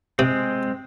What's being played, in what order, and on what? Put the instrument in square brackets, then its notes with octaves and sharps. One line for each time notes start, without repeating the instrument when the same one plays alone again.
[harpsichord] C3 [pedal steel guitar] G#3 C4